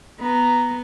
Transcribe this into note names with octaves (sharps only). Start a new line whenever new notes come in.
B3 A#5